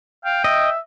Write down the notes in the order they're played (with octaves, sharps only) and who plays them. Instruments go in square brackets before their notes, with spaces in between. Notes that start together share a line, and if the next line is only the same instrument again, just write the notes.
[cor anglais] F5 [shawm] G5
[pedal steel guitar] D#5 [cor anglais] E5